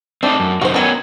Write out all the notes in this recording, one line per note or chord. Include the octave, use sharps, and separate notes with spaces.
A3 C4 D4 D#4 G4
F#2
F#2 C3 D#4 F#4 C5
D#3 F#3 B3 C#4 G#5